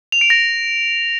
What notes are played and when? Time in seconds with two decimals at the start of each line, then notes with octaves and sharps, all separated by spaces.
0.12 F7
0.21 D7
0.30 A#6